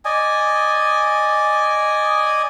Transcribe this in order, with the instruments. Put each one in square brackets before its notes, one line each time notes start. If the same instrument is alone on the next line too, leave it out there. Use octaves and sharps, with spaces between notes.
[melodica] D5 D#5 G#5